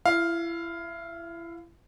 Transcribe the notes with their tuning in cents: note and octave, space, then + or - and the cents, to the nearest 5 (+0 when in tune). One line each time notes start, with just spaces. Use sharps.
E4 +30 F5 +0